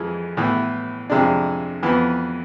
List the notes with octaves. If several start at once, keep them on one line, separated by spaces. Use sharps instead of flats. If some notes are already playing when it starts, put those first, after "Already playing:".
Already playing: F2 E3 G#3
A2 E3 B3
F2 C3 G#3 D4
F2 E3 B3